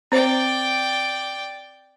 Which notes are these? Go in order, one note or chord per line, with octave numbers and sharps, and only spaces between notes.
C4 C5 D5 G5